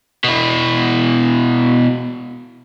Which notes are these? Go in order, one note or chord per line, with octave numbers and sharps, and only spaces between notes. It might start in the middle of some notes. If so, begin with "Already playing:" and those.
B2 E4